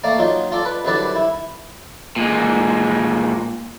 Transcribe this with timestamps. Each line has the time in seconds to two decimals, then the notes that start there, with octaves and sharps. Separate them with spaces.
0.04 A3 A#3 D5 F5
0.18 F#3 D#4 F4
0.52 F4 A4 D5
0.65 B4
0.85 C2 F#2 D3 B4 D5 A5
1.15 E4
2.16 A#2 G#3